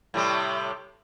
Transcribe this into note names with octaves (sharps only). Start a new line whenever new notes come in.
A2 C3 G3